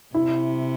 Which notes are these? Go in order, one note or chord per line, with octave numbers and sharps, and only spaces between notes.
C3 E4